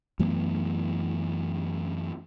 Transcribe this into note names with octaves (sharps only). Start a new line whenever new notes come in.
F#2 E3 A3 B3